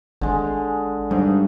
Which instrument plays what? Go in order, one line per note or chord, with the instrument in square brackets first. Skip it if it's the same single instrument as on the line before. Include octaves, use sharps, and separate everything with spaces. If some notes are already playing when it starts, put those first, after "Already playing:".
[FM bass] G#1 [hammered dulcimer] D3 G#3
[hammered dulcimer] G#2 [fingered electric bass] G3 D4